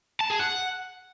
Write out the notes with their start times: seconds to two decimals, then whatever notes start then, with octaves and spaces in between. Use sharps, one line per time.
0.21 A5
0.30 G#4
0.39 F#5